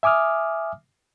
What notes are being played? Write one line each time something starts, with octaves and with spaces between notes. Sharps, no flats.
E5 G#5 D6 D#6 F6